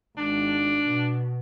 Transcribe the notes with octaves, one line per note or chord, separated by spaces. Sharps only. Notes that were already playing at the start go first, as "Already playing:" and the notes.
G#1 D4
B2